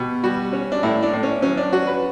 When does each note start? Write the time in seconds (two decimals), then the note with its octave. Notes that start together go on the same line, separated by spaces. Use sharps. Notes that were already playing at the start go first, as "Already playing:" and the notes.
Already playing: B2 G4
0.23 G3 F#4
0.53 C#4
0.72 D4
0.83 A2 E4
1.03 D4
1.13 A2
1.23 C#4
1.42 F#3 C#4
1.57 D4
1.73 C#4 F#4
1.87 B4